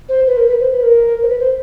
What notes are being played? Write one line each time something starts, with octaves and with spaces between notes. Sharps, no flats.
C5
B4
A#4
B4
C5
B4
A#4
C5
B4
C5